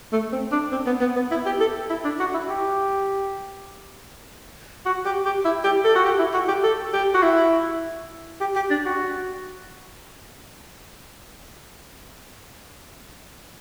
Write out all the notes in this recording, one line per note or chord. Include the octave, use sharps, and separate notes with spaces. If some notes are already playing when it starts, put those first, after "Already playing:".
A3
C4
D4
C4
B3
B3
B3
E4
G4
A4
E4
D4
F#4
E4
G4
F#4
G4
G4
E4
G4
A4
F#4
G4
E4
F#4
G4
A4
G4
F#4
E4
G4
G4
D4
F#4